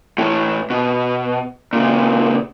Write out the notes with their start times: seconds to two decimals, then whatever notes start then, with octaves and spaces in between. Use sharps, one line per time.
0.18 A2 E3
0.70 B2
1.73 A#2 C#3